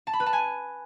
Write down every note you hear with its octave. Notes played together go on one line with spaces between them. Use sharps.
A5
B5
B4
A5
G#5